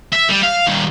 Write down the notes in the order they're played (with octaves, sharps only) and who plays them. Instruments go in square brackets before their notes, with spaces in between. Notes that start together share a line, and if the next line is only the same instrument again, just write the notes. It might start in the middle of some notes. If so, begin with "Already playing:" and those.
[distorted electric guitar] E5
G3
F5
D#3 G3